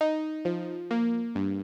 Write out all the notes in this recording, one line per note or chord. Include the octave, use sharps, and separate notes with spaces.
D#4
F3
A#3
G2